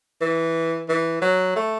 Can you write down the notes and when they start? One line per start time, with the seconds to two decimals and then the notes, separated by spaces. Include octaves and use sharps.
0.22 E3
0.89 E3
1.22 F#3
1.56 A3